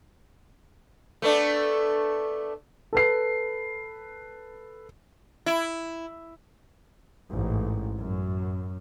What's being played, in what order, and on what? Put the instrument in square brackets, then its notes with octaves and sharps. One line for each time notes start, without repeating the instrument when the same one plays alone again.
[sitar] A3 B3 D4
[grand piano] A4 B4 C7
[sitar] E4
[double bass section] A1 G#2
F#2